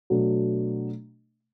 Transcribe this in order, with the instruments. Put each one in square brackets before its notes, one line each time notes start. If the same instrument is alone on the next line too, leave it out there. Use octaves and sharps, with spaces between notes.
[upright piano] B2 F#3 A3 D4